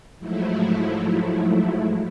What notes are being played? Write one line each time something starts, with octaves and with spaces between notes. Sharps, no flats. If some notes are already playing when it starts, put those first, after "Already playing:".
G#2 F3 F#3 A3 E4